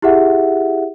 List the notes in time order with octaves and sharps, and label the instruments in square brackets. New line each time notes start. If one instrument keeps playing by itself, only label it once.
[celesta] E4 G4 G#4 E5 F#5